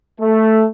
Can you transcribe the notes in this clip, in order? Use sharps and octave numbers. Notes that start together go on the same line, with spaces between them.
A3